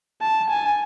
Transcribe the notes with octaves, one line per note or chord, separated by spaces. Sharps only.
A5
G#5